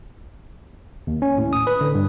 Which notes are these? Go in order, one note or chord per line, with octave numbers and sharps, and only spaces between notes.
D#2
C#4
A2
D#6
B4
D3
G2